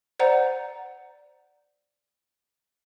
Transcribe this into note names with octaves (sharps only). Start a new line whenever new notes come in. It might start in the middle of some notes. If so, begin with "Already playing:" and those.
C5 D5 F#5 A#5